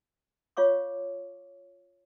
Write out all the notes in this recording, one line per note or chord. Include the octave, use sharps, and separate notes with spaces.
F4 C#5 F5 C#6 D6